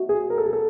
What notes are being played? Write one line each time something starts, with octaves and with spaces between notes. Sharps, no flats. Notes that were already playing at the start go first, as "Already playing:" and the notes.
Already playing: B2 F#3 A3
G#4
A#4
A4
G#4
A4